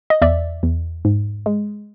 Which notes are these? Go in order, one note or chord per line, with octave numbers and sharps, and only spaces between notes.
D#5
E2 D5 E5
E2
G#2
G#3